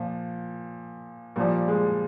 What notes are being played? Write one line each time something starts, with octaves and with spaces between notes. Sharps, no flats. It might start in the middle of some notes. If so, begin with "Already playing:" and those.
Already playing: A#2 F3
A#2 F3 G3
G#3